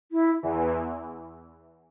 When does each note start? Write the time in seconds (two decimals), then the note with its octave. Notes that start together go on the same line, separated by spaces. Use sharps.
0.12 E4
0.43 E2 E3